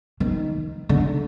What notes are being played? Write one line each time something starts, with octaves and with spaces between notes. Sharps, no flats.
D#3
D3